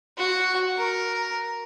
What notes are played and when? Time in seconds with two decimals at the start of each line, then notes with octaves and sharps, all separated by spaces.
0.17 F#4
0.78 A#4